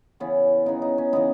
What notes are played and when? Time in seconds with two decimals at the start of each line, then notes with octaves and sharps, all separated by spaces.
0.20 C#3 E3 B3 C#4
0.66 C#3 E3 B3 D#4
0.82 D#4
0.98 C#4
1.13 C#3 E3 B3 D#4